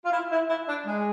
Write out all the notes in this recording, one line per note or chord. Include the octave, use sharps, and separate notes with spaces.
F4
E4
E4
E4
D4
G#3